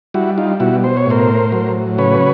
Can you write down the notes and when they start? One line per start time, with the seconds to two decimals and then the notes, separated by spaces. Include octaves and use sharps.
0.14 G3 E4 F#4
0.38 D#4 F4
0.60 B2 E4 F#4
0.84 C5
0.97 C#5
1.06 A2 A#4 C5
1.52 F#3
1.98 C#3 B4 C#5